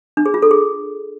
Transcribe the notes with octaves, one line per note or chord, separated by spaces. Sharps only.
D4
G#4
F4
A4
G#4